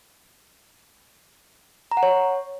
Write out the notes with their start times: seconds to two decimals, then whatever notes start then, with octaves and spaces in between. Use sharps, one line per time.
1.92 A#5
1.97 F#5
2.03 C#5